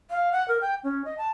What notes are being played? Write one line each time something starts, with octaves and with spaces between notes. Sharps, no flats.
F5
F#5
A#4
G5
C#4
D#5
A5